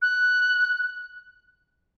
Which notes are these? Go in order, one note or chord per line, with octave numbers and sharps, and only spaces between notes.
F#6